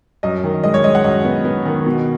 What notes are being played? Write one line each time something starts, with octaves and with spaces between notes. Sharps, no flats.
F#2 D#5
D#3
G#3 D#5
C#5
G#3 D#5
F#5
F#2 D#5
B3
B3
D#3
B2